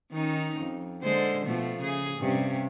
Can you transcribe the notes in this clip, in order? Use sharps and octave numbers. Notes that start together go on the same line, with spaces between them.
D#3 C#4 D#4
F2
D3 G#3 C5
B2 F3 A3
C#3 G#4
G2 C3 C#4